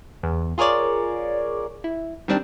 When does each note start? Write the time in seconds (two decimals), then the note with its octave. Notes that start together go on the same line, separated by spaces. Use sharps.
0.23 E2
0.58 F4 G#4 A#4 C#5 D5
1.84 E4
2.28 D#3 G3 C4 D4